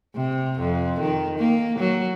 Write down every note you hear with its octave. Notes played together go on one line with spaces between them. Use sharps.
C3
F2
D#3
A#3
F#3